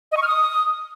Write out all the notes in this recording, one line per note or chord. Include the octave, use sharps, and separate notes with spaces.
D#5
C#6
F6
D#6